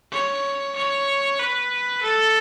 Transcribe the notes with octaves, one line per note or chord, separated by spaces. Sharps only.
C#5
C#5
B4
A4